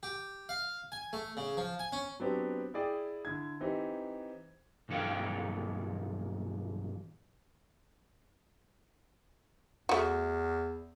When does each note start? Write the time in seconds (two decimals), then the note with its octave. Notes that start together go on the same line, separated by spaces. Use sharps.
0.03 G4
0.49 F5
0.92 G#5
1.13 A3
1.37 C#3
1.57 F3
1.79 G#5
1.92 C#4
2.20 F#3 B3 C4 D4 G4
2.74 E4 G#4 D5 G5
3.25 D3 E4 G#6
3.61 E3 C4 D#4 G4
4.89 B1 G2 E3 A4 F5 G5
9.89 E2 A3 F#4